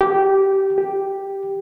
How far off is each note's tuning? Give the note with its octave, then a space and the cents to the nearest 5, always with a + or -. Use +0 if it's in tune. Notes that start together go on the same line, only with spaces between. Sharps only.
G4 -15
G4 +0